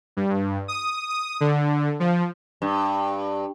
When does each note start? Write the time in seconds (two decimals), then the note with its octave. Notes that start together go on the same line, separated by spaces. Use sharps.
0.17 G2
0.68 D#6
1.09 D#6
1.41 D3
2.00 F3
2.62 G2